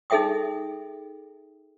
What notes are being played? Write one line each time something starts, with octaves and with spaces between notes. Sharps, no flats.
D#4 G#4 A4 E5 G5 D#6